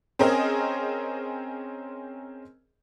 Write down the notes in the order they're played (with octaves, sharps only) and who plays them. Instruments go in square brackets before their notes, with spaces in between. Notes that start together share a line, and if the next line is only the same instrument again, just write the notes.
[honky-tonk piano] C4 C#4 G#4 A#4 C5 D#5